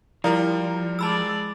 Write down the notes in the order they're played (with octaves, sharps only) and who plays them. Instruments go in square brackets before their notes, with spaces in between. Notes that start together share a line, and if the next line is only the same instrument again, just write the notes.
[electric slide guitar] F3 [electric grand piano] G3 A#4 F5 [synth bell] E4 D5 A#5
[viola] G#3 D5 [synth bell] A5 B5 E6